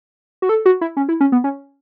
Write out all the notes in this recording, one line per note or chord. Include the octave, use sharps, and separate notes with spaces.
F#4
A4
F#4
E4
C#4
E4
C#4
B3
C#4